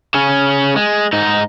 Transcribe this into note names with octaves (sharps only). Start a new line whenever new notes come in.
C#3 C#4
G#3
G#2 D#4